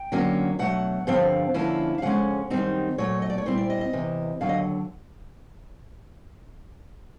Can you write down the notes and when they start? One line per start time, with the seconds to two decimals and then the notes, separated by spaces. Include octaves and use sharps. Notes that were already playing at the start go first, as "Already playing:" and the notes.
Already playing: G5
0.12 D3 F#3 A#3 C#4
0.59 B2 F#3 A3 F#5
1.07 G2 D3 F3 C4 F5
1.54 D3 F3 A#3 C#4 E4
1.98 F5
2.02 F2 C#3 G#3 C#4 F#5
2.50 F#2 D#3 G3 C4 D#4
2.98 A#2 F#3 A3 C#5
3.22 D#5
3.30 D5
3.38 C#5
3.46 A#2 G3 C4 E4 C5
3.58 D5
3.70 D#5
3.81 D#5
3.93 E2 C3 E3
4.41 D#2 D3 F#3 F5
4.49 D#5